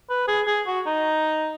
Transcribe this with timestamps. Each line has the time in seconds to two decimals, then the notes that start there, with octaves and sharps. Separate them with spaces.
0.10 B4
0.28 G#4
0.47 G#4
0.67 F#4
0.86 D#4